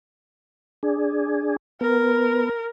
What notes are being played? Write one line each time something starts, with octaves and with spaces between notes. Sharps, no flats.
D4 G#4
B3 A#4